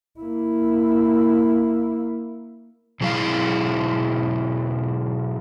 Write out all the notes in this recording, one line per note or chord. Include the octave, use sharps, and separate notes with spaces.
A#3 E4
B2 F#3 G#3 E4 F5